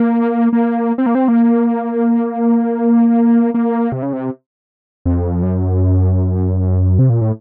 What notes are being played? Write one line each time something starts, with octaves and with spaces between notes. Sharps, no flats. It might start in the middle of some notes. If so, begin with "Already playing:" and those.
Already playing: A#3
A#3
C4
A#3
C4
A#3
A#3
C3
C#3
C3
F2
F#2
C3
A#2
A2